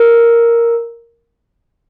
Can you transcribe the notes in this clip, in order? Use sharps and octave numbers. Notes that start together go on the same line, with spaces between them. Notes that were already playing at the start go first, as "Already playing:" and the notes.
Already playing: A#4